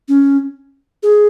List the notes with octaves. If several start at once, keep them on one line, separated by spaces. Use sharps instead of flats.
C#4
G#4